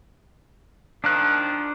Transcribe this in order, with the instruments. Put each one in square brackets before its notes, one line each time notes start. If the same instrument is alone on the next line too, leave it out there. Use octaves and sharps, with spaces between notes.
[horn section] D#3 F3 [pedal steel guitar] D4 F#6